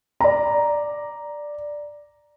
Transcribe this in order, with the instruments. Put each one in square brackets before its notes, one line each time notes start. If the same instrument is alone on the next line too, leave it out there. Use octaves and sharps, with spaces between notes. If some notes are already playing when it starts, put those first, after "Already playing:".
[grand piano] D5 A#5